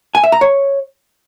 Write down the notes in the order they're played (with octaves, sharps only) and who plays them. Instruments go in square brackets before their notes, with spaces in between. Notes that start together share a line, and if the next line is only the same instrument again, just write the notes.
[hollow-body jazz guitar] G#5
E5
A#5
C#5